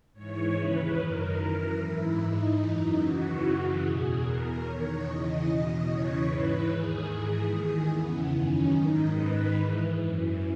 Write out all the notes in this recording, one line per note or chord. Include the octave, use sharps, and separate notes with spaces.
G#2 E3 C#5
D#2 C#3 E3 B4
F#2 D#3 A#4
F#2 E3 A#4
G#2 E3 E4
G#2 E3 D#4
F#2 E3
D#2 C#3 E3 F#4
F#2 C#3 E3
E2 B2 G#4
E2 B2 A#4
E2 D#3 C#5
E2 C#3 E3 D#5
E2 B2
E2 C#3 E3 C#5
G#2 E3 B4
D#2 D#3 G#4
G#2 E3
D#2 D#3 G#4
E2 C#3 E3 B3
F#2 D#3 C#4
G#2 D#3 D#4
G#2 D#3 B4
G#2 E3
F#2 E3